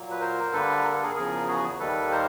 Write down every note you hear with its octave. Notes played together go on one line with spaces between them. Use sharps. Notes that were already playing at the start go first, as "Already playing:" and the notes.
Already playing: A#2 F#3 A#3
B4
A#4 C5
G2 D3 G3 A#3 A4 B4
A#4
A4
G#4 A#4
E2 C#3 F3 G#4 A#4
F#4 G#4
D#2 D#3 G3 A#3 A4 B4
A#4 C5